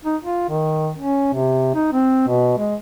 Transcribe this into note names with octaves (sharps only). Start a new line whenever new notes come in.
D#4
F4
D#3
C#4
C3
D#4
C4
B2
G#3